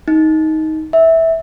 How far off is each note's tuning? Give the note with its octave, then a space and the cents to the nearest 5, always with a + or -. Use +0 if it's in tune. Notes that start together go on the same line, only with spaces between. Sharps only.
D#4 +15
E5 -15